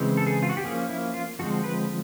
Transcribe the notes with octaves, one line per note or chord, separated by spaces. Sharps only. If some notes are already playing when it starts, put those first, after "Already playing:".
Already playing: C#3 E3 G#3 C4
A4
G#4
F4
F#4
G4
F3 A#3 C#4 G#4
E4
F4
D3 F3 G#3 C4 F#4
B4